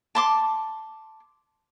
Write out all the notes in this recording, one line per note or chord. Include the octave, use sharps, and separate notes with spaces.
A5 C6 D6